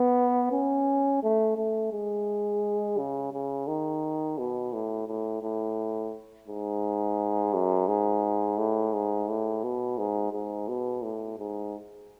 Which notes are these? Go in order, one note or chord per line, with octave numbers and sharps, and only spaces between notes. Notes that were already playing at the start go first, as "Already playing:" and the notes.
Already playing: B3
C#4
A3
A3
G#3
C#3
C#3
D#3
B2
A2
A2
A2
G#2
F#2
G#2
A2
G#2
A2
B2
G#2
G#2
B2
A2
G#2